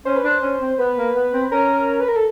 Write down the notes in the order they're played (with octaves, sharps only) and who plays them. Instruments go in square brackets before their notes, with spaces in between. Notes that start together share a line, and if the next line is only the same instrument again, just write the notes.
[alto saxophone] C#4 [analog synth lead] C5
[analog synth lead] B4
[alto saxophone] D4 [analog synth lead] C5
[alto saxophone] C#4
C4
[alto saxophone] B3 [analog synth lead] B4
[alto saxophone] A#3
B3
C4
[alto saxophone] C#4 [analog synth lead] A#4
[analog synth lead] B4
A#4
A4